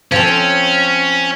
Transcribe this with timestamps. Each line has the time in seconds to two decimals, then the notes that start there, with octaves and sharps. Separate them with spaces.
0.12 F3 C4 C#4